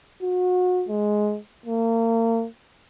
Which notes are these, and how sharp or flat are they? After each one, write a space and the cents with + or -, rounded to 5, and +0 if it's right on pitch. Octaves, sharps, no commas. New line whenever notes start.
F#4 -30
G#3 +10
A#3 -35